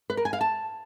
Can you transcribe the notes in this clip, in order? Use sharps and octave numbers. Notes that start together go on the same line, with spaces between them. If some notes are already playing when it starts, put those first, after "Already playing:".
B4
A#4
G#5
F5
A5